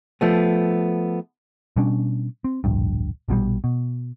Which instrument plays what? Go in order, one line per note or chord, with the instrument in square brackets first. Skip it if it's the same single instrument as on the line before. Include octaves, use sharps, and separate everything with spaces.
[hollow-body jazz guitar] F3 A3 B3
[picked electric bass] B2 G3 C#4 D4
C4
D1 A#1 G2
A#1 B2 E3 G3
B2